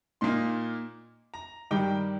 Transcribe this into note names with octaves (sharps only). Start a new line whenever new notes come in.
A#2 A#3 D#4 C6
A#5
G2 D#3 G3 G5